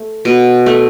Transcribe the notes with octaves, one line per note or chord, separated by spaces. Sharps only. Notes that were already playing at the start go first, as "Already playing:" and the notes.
Already playing: A3
B2
A3